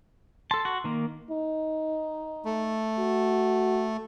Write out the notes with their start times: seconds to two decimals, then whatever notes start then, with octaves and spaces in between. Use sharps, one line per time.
0.51 A4 A5 C6
0.65 F#4
0.84 D#3 A#3
1.31 D#4
2.45 A3
2.99 F#4